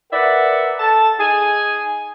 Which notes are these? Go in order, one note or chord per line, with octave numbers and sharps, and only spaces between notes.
A#4 B4 D5 E5 F#5
A4 A5
D#4 G#4 G#5